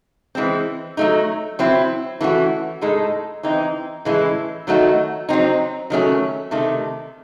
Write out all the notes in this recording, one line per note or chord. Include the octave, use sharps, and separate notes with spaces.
E3 G#3 C4
F#3 A3 D#4
F#3 C4 E4
E3 A3 C#4 F#4
A2 G#3 D#4 A4
E3 C4 D#4
A2 E3 G#3 C#4 E4
D#3 F#3 A3 D#4 F#4
F#3 C4 D#4
D#3 F#3 A3 C#4
C3 D#3 A3